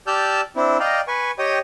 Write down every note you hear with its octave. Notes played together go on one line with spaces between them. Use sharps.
G4 D5 A5 E6 F6 G6
C4 D4 E4
D5 D#5 F5 G5 A#5
B4 G#5 C#6
G4 C#5 D#5 G5 D#6